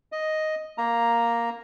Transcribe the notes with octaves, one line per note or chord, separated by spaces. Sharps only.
D#5
A#3 A#5